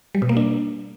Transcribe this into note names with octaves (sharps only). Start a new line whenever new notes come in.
G3
B2
A#3
D4